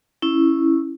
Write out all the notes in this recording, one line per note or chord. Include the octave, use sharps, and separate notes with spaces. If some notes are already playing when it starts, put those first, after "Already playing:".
C#4 E4